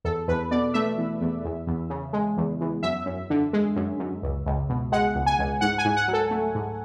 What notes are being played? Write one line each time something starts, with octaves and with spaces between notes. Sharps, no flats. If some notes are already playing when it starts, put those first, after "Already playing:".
E2 A4
E2 B4
B2 D5
A3 E5
E2
E2
E2
E2
C#3
G#3
E2
E2
F#2 E5
F#2
D3
G#3
F#2
F#2
C#2
C#2
B2
G#3 F#5
C#2
G#5
C#2
G#2 F#5
G#5
G#2
F#5
F#3
A4
A3
G#2